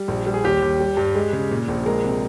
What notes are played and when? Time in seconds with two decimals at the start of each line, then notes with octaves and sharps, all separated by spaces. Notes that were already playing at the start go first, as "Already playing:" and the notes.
Already playing: G3
0.08 A#1
0.26 G3
0.34 G#4
0.44 D#2 G4
0.62 D#2
0.80 G3
0.97 G2
1.15 G#3
1.33 C#3
1.51 A#2
1.68 A#1
1.86 G#3 A#4
2.04 C3